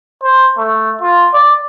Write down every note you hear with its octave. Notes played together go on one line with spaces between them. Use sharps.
C5
A3
F4
D5